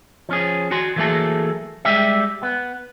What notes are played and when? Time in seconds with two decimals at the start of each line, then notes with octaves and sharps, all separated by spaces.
0.29 F3 C#4 G#4
0.71 F#4 G#5 C6
0.96 E3 F#3 A3 A#3 G#4 A4
1.85 G3 G#3 G4 E5
2.43 B3